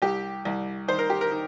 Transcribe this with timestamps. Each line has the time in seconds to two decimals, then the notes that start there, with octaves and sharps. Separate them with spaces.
0.02 C2 G4
0.45 C2
0.88 D#3 C5
0.99 A#4
1.10 G4
1.21 A#4
1.31 D#3